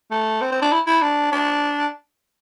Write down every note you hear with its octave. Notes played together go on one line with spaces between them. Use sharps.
A3
C4
C4
D4
E4
E4
D4
D4